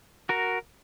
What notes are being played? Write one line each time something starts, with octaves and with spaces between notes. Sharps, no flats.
F#4 A#4